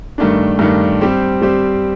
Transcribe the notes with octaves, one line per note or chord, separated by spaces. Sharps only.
G2 D#3 A3 D4
G2 D#3 A3 D4
G3 C4 G4 C5
G3 C4 G4 C5